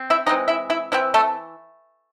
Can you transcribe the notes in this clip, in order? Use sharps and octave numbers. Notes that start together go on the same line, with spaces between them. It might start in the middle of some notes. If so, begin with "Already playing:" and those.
Already playing: C4
E4 E5
E3 G#3 C4 D#4 D#5
E4 E5
E4 E5
E3 C4 E4 E5
A3 A4